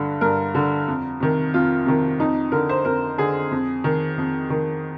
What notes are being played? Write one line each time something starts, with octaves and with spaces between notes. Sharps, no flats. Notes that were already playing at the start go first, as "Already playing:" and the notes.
Already playing: G2 D3
G2 A#4
D3
F2
C3 D#3
F2 F4
C3 D#3
F2 D#4
D3 A#4
C5
F2 A#4
D3 G#4
F2
D#3
F2
D#3